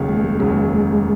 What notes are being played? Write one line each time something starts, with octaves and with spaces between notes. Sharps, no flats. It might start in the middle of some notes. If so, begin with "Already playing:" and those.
Already playing: F1 D#2 C#3 F#3
G#3
G#3
F1 D#2 C#3 F#3 G#3